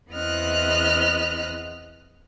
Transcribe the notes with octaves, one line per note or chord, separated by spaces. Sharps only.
E2 B3 C4 D#5 F6 F#6